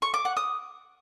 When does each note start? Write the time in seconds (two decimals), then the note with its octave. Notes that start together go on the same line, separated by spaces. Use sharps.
0.02 C#6
0.14 D6
0.25 F#5
0.37 D#6